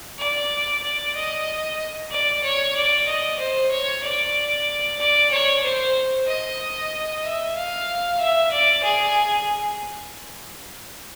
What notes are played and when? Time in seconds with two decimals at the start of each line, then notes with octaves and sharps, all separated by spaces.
0.19 D5
0.82 D5
1.15 D#5
2.10 D5
2.43 C#5
2.75 D5
3.07 D#5
3.39 C5
3.71 C#5
4.03 D5
4.99 D5
5.31 C#5
5.63 C5
6.27 D#5
7.23 E5
7.56 F5
8.20 E5
8.52 D5
8.83 G#4